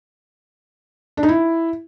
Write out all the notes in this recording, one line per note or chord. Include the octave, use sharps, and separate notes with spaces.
D4
D#4
E4